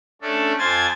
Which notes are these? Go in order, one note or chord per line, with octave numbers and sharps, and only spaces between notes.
A3 C#4 D4 A4
F2 F4 C5 G#5 G#6 A6